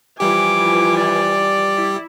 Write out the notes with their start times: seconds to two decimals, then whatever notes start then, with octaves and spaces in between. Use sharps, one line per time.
0.20 E3 F3 G3 G4 G#5 D6
0.97 D5
1.76 E4